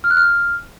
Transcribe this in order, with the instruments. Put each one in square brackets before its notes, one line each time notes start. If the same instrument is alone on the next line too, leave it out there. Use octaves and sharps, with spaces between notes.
[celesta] F6
F#6
F6